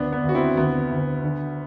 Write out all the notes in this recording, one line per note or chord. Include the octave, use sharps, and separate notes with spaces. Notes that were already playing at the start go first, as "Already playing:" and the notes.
Already playing: D2 B3 D4
B3 D4
D2
F#4
C4 E4
D2 B3
D2
D3